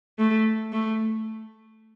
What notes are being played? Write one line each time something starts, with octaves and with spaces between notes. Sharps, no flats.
A3
A3